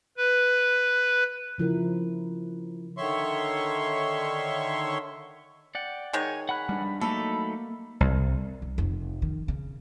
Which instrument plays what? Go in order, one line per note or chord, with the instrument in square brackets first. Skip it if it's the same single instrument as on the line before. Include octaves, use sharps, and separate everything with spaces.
[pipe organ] B4
[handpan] C#3 F3 E4 A#4
[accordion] D3 D#3 C#5 E5 C6 C#6
[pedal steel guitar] D5 F#5 G5
[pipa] D#3 G#3 C#5 [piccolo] G#5
[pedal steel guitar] F#5 G#5 F#6 [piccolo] B5
[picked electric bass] G3 D4
[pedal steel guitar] F#3 A3 D#4 [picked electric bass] A#3 [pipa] A4 [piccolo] B5
[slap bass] C2
[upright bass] C2
F1
D#3
C#3